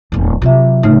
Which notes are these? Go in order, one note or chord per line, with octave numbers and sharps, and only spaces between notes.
D1 E2
C3 F#3 F4 E5
A2 C#3 A3 D#4